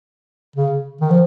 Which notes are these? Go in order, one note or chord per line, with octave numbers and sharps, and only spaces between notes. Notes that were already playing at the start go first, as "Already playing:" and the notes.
C#3
D#3
F3